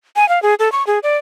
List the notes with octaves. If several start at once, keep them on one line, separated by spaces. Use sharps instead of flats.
G#5
F5
G#4
A4
C#6
G#4
D5